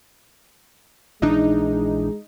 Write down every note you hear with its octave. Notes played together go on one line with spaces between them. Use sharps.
A#1 E3 G#3 D4 D#4